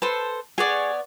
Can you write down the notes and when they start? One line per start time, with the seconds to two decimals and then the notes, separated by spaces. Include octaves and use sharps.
0.02 A4 B4 C5
0.58 B3 G#4 C#5 D5